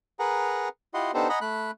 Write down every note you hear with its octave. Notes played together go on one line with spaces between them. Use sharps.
G#4 A#4 B4 F#5 A#5
E4 F4 G4 D#5 F#5 C6
B3 D4 D#4 G4 A4 C5
D#5 F#5 G#5 A#5 B5 D#6
A3 B5 F#6